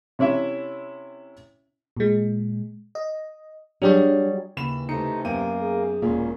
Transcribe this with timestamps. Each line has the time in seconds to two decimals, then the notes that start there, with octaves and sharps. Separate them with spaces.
0.19 C3 C#4 E4 E5
1.97 A#2 G#3
2.95 D#5
3.82 F#3 G3 D4 G4 G#4 C#5
4.57 D#2 C#3 E3 B5 E7
4.89 C3 E3 A3 D#4 C#7
5.25 F#2 A#3 B3 G5 D#7
5.62 G#4
6.02 E1 A#2 A#3 C#4